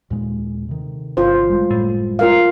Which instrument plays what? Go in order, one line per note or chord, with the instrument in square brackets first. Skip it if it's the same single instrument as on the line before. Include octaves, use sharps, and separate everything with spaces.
[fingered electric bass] D#2 A#2 G#3
C3 D#3
[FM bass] G1 [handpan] F4 C5
[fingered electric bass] F#1 G3 G#3
[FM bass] A2
[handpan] F4 A#4 F5